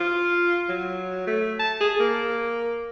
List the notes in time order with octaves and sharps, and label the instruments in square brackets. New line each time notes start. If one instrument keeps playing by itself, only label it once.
[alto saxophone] F4
F#3
A3
A5
G#4
A#3